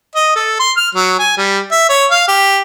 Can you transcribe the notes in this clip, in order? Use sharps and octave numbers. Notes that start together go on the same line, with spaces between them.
D#5
A4
C6
F6
F#3
G#5
G3
E5
C#5
F5
G4